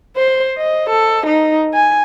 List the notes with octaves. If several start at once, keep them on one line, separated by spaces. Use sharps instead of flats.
C5
D#5
A4
D#4
G#5